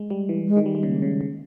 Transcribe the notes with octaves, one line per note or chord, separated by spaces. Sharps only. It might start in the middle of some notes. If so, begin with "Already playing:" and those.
Already playing: G#3
G3
E3
G#3
D#3
G3
G#3
C#3 A#3
C#3
C#3